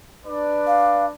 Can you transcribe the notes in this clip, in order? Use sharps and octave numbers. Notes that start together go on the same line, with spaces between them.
D4 B4 D5
F5